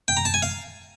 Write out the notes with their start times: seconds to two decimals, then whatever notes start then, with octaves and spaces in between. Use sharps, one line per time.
0.08 G5
0.17 A#5
0.25 A5
0.34 G#5
0.42 F5